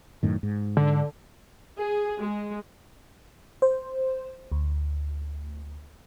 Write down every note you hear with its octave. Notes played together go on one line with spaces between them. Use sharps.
F#2 A2 D#3
G#2
D3
G#4
G#3
C5
D2